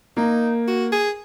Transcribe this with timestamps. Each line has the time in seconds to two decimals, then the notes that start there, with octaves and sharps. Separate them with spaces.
0.17 A#3 D#4
0.68 F#4
0.92 G#4